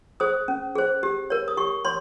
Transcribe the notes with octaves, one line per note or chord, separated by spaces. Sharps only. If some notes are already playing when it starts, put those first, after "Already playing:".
G#4 C5 D#6
C#4
G#4 C5
G4
A#4 C#5
D#6
G4 C#6
C#5 C6